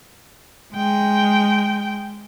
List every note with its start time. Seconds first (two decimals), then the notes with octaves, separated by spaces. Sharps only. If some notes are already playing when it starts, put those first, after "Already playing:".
0.73 G#3 G5